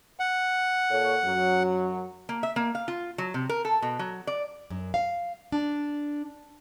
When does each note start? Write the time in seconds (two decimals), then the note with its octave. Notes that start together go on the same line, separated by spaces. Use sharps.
0.20 F#5
0.90 A#2 A4 C#5
1.25 F#2 F#3
2.29 A#3
2.43 E5
2.56 A#3
2.75 F5
2.88 F4
3.18 F#3
3.34 C3
3.49 A#4
3.65 A4
3.82 B2
3.99 F#3
4.27 D5
4.70 F#2
4.94 F5
5.52 D4